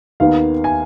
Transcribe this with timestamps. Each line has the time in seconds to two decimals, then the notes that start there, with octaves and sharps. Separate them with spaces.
0.20 D#2 D#3 B3 F5
0.64 G#5